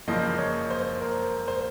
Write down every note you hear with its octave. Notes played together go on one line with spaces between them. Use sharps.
F#1 F#2 F3 A#3 D#5
C#5
C5
A#4
C5